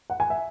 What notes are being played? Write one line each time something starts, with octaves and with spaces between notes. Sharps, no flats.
F#5
G#5
E5